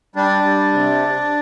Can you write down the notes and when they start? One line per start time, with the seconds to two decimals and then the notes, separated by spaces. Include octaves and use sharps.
0.16 G3 D4
0.44 G3
0.73 C3